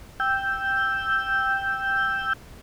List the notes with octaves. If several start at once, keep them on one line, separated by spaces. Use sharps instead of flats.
G5 E6 G6